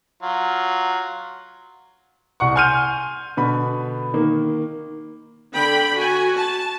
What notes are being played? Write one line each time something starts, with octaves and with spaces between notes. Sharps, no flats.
F#3 F4
C2 F#5 C#6
G#5 C6 F6 G6 D#7
B2 D3 B5
D#3 A#3
D3 G5 B5
F#4 G#5
A5